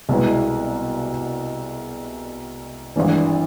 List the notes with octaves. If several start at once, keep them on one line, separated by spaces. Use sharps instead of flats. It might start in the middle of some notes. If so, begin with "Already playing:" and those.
C2 B2 G#3 B3 E4
G#1 G2 E3